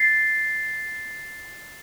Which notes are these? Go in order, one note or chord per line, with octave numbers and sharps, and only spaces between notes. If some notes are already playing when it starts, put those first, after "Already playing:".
Already playing: A6 C7